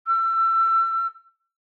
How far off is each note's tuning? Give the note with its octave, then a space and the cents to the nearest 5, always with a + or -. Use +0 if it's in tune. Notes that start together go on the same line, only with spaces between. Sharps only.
E6 +30